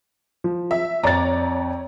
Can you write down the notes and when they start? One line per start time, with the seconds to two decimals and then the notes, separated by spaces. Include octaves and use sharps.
0.44 F3
0.71 E5
1.03 F2 C#5 D5 A#5 A6